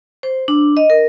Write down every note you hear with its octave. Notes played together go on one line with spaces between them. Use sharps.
C5
D4
D#5
A#4